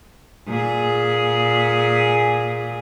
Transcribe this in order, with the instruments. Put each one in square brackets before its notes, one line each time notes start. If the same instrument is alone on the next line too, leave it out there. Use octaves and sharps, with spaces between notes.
[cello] A#2 G#4